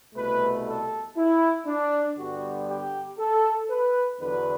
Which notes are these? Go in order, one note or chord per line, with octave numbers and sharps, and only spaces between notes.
C2 B2 A3 B4
A4
E4
D4
G2 D3 G3 B3 F#4
G4
A4
B4
E2 D3 F#3 B4